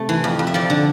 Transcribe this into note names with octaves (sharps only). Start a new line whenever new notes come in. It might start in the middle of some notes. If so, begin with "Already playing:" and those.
Already playing: C3 A3
E3
F2
F2
E5
F3 D5
D3